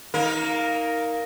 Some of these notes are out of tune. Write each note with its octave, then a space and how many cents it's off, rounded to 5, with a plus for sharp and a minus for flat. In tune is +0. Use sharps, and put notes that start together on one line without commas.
A#3 +0 D#4 +25 A#4 +0